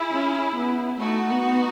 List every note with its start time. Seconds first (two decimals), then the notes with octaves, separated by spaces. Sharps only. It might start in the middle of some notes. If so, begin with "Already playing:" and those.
Already playing: E4 G#4
0.12 C#4
0.56 B3
1.00 A3 D#4 F#4
1.30 B3